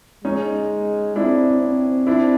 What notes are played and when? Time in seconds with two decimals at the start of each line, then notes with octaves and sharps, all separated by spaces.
0.25 G#3 C#4 D#4
1.16 C4 D4 E4
1.62 C4
2.07 C4 D4 E4